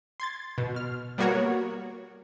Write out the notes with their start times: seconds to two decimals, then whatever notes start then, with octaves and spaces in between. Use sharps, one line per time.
0.20 C6 G#6 A6
0.58 B2
0.76 F6
1.18 G3 A#3 B3 F#4 A#4 C#5